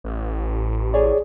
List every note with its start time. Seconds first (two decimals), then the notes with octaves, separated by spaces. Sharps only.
0.04 A1
0.94 G#4 C#5 D5